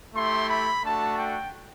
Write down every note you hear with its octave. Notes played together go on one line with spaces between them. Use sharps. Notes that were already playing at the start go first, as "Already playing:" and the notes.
A3 E4 G4 C6
B5
A3 D4 F#4 A5
G5